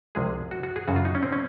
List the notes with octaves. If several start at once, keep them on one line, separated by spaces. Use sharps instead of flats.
C2 C3 F3 G#3 G#4
F#4
F#4
G#4
F#2 C#3 F#3 F#4
F4
D#4
C#4
C4
C#4